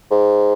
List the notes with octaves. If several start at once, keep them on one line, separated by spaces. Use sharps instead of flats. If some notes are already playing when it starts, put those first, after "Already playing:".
G#2